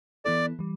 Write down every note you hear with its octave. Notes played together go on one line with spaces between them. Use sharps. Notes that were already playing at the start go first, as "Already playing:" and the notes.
E3 B3 E4 A4 D5
E3 G3